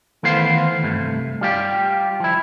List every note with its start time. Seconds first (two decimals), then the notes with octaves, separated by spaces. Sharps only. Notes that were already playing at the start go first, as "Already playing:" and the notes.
0.23 D#3 E3 A3 B3 C5 F5
0.83 C2 G2 A3
1.41 G3 F4 G4
2.20 F3 E4